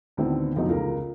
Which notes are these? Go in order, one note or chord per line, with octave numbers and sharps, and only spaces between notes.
D2 A2 D3 D#3 B3 C4
F1 B1 E2 F#3 B3 D#4
C#2 F4 A4 A#4